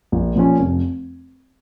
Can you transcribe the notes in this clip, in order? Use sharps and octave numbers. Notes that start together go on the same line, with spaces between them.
A#1
A#2 F3 C#4
F1